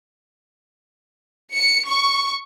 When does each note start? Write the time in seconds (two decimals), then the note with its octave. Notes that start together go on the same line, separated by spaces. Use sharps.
1.53 C#7
1.87 C#6